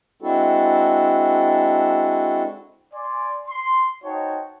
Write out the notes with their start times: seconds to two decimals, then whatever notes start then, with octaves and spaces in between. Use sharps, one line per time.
0.22 G#3 C4 D4 E4 F#4 A4
2.94 D5 G#5 C6
3.48 C6
4.04 D#4 F#4 C5 C#5 G5 A5